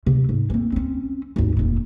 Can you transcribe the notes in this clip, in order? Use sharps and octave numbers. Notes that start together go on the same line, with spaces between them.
C3
G#2
A#3 C4
C4 C#4
G#1 D#2
F1 A#2